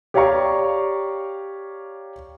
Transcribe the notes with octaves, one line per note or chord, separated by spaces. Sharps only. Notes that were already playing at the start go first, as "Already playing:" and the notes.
G4 C#5 D5 F5 A#5 C#6